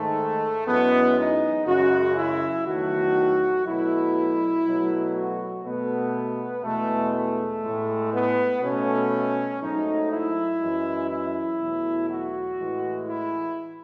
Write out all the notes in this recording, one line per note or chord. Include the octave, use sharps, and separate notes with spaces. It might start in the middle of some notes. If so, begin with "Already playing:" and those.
Already playing: G#2 D#3 G#3 A3
F#2 E3 G#3 B3
D#4
F#2 C#3 G#3 F#4
E4
E2 D#3 F#3 A3 F#4
B2 F#3 A3 E4
B2 F#3 A3
F#4
B2 A3 B3
E2 B2 G#3 A3
A3
A2 G#3
B3
B2 A3 C#4
G#2 F#3 A3 D#4
E4
F#2 E3 G#3
E4
E2 B2 F#3 A3
F#4
A2 E3 G#3
E4